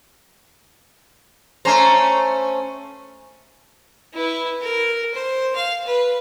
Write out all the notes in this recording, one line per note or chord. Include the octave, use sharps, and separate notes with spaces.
A3 C#4 C5 A#5
E4 B4
A#4
C5
F5
B4